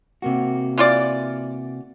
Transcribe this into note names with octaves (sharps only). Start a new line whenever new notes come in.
C3 A#3 F#4
E3 F4 D5